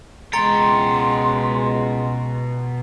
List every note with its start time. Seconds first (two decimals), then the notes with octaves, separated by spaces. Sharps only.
0.33 C#2 B2 G#3 G5 A#5 C6 A6 C#7